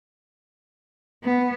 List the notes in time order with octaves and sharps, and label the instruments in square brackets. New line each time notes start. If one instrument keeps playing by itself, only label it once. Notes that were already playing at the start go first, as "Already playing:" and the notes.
[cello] B3